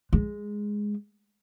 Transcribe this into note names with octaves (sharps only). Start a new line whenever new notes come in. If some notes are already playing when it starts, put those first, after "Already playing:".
G#3